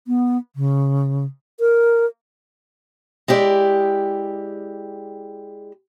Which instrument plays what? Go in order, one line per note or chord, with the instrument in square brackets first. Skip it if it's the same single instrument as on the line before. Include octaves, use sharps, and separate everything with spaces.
[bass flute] B3
C#3
A#4
[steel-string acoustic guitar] G#3 E4 G4 D5